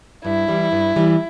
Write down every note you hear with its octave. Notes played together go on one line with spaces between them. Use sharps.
G2 E4
E3 G3
G2
E3 G3